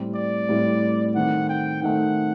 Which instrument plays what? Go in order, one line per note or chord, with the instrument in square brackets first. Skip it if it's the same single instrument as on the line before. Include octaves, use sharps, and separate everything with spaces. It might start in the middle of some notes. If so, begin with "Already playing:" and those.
Already playing: [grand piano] A2 G3 C4
[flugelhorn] D5
[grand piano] A2 G3 C4
[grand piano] D#3 A3 C4 [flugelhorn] F#5
[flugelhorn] G5
[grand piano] D#3 A3 C4 [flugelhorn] F#5